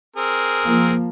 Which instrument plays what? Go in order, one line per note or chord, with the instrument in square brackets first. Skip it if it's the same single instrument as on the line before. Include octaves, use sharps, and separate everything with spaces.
[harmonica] C4 G#4 A#4
[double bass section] F3 A#3